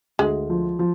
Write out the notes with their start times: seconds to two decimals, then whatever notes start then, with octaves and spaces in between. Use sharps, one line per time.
0.19 D2 G#3
0.50 F3
0.79 F3